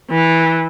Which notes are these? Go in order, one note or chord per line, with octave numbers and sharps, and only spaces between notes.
E3